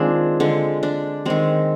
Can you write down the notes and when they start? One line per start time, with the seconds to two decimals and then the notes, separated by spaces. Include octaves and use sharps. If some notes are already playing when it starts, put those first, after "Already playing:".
Already playing: D#3 G#3 C4 D4 F4 G#4
0.40 D3 G#3
0.83 D4
1.25 D#3 G#3 C4